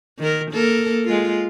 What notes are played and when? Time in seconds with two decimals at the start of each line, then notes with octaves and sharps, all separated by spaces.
0.19 D#3 A#4
0.51 A#3 A4 A#4
1.05 G#3 F4